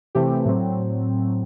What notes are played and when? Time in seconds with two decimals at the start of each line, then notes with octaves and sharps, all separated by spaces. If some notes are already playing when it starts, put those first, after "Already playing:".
0.15 C3 E3 A3 C4 G4
0.45 A2 F#3 C4